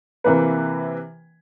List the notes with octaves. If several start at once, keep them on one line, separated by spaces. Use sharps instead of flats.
C3 E3 A#3 B4